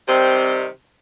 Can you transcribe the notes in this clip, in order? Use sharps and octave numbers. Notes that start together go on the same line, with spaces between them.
C3 D#3 G3 C4